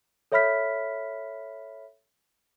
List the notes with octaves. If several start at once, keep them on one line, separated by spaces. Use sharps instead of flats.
A4 C#5 E5 B5 F6 B6